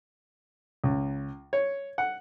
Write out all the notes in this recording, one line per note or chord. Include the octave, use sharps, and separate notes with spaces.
C#2
C#5
F#5